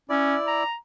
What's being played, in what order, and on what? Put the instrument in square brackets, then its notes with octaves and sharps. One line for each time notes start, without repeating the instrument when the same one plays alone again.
[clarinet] C#4 [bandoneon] E4 D5
[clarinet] A#5